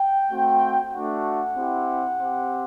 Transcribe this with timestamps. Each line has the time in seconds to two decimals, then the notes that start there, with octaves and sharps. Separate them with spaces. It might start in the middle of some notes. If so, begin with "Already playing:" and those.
Already playing: G5
0.31 A3 C4 F#4
0.94 A3 D4 F#4 F#5
1.57 C4 E4 G4
2.20 C4 G4